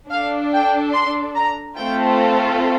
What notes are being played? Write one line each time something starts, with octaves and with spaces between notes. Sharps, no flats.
D4 A4 F5
G5
C6
A#5
A3 C4 F4 A4 G5